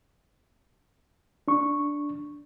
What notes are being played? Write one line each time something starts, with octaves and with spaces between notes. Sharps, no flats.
D4 C#6